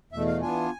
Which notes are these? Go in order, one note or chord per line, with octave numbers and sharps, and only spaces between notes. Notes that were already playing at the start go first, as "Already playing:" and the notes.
E2 B2 A3 E5
F5
E3 B3 D4 F4 G#5